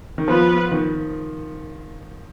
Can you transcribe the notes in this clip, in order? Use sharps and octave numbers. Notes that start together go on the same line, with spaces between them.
D#3
F3 B3 F4 B4
D#3